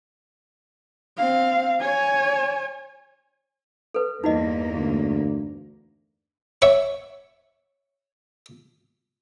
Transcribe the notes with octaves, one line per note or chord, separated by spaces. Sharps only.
C4 F5
C#5 G#5
A4 B4
E2 G2 A#3 D#4 F#4 D#5
D2
C#5 E5 F#5 C#6